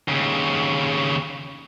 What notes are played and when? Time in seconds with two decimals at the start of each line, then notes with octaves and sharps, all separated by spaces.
0.08 D#2 C#3